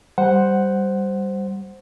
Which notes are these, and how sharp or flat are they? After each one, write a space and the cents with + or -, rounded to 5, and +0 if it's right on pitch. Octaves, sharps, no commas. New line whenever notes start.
G3 -5 C5 +0 F#5 +0